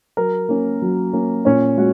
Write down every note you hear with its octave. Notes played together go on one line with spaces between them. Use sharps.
F#3 A#4
A#3 C#4
F#3
A#3 C#4
A#2 C#4 C#5
G#3 F#4